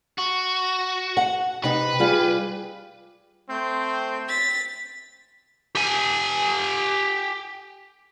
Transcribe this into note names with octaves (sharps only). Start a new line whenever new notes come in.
F#4
F#5
C3 D#4 B4
G3 F4 G#4
A3 C4 C6 G6
A6 B6
G4 G#5